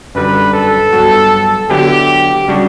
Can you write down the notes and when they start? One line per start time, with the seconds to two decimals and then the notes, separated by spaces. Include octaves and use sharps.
0.15 F#2 D3 G3 B4
0.54 A4
0.93 G2 F#3 B3 F#4
1.70 D3 F#3 B3 E4 G4
2.48 C#3 G3 D4 F#4